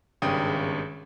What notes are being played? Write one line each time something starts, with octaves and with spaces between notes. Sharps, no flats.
G#1 G2 C#3 G5 D#6